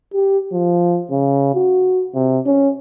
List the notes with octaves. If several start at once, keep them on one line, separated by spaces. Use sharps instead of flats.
G4
F3
C#3
F#4
C3
C#4